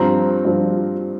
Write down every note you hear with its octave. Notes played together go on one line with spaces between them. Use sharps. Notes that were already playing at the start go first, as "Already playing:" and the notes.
Already playing: G2 F3 C4 A#5
G2 F3 C4